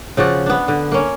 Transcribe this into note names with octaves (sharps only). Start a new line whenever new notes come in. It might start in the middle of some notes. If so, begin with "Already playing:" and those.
C#3 F3 F#4 D5
B3 D4
D3
A#3 C#4